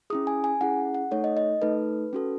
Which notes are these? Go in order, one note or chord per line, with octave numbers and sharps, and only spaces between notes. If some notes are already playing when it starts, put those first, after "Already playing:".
C#4 E4 G#4 D#6
G#5
G#5
C#4 E4 G#4 F#5
F#5
A3 D#4 A4 C#5
D#5
D#5
A3 D#4 A4 B4
C#4 F#4 A4